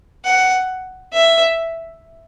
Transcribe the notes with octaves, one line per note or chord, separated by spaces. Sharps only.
F#5
E5